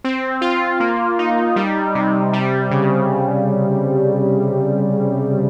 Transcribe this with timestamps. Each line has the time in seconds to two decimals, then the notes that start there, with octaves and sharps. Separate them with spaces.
0.04 C4
0.41 F4
0.80 A#3
1.19 D#4
1.56 G3
1.95 C3
2.33 G3
2.71 C#3